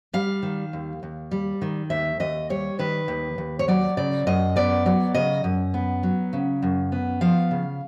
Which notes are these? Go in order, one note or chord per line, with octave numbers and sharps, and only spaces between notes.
G3 F5
D#3
D#2
D#2
G3
D#3
D#2 E5
D#2 D#5
G3 C#5
D#3 B4
D#2
D#2
C#5
F#3 D5
C#3 D5
F#2 D#5
B3 D5
F#3 D5
C#3 D#5
F#2
B3
F#3
C#3
F#2
B3
F3 F5
C#3